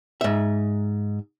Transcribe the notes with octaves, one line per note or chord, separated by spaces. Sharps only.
G#2 E5